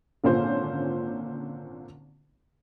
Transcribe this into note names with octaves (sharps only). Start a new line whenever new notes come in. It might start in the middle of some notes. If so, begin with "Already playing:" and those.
G#1 A#2 D3 C#4 F4 C5